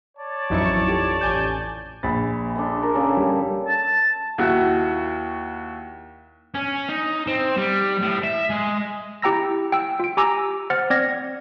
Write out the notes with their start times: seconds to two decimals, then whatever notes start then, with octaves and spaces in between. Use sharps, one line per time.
0.18 C#5 D5 A5
0.50 A1 F2 F#3 D#4 E4 C#6
0.87 F4 G4 A4
1.21 A1 G#5 G6
2.03 A#1 B5 A6
2.56 D4 A4 C6
2.82 A#4
2.95 C#3 A#3 A4
3.17 G3
3.67 A5
4.38 D#2 E4 F#4
6.54 C#4
6.89 D#4
7.27 C4
7.57 G3
8.02 A2
8.24 E5
8.50 G#3
9.22 E4 G4 G5 A#5 E6 A#6
9.72 G5 E6
10.00 F4 D7
10.17 G4 G#5 A#5 D6 E6 A#6
10.70 C5 F#5 F6 A6
10.90 C4 D5 F6 G#6 A#6